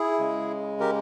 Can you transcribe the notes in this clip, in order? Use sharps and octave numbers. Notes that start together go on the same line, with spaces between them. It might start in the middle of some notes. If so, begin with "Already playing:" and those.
Already playing: E4 G#4
C#3 G#3
G4 A#4